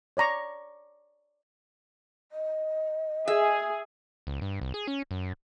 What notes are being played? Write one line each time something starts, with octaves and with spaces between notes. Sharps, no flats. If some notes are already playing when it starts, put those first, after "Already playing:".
C#5 D5 A#5 C#6
D#5
G#4 E5
C#2
G2
C2
G#4
C#4
F#2